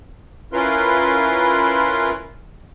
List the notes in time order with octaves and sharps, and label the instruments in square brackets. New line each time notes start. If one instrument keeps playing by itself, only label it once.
[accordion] C#4 E4 F4 A#4 B4 C6